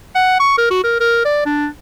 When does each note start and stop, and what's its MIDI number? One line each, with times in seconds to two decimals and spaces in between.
0.15 0.39 78
0.40 0.55 85
0.58 0.66 70
0.70 0.84 66
0.84 0.97 70
1.00 1.22 70
1.25 1.42 74
1.46 1.68 62